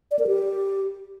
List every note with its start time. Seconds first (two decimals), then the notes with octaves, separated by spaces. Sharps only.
0.11 D5
0.19 A#4
0.27 G4